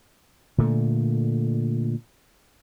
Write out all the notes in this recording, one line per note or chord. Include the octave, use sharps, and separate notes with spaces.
A#2 D3 A3